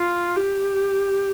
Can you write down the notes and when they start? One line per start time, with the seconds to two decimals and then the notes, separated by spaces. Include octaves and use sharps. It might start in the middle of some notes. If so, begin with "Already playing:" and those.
Already playing: F4
0.36 G4